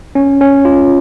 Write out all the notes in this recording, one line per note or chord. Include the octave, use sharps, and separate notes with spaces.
C#4
C#4
F4